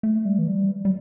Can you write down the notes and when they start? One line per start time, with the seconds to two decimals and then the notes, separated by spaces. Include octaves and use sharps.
0.03 A3
0.25 G3
0.39 E3
0.48 G3
0.85 G3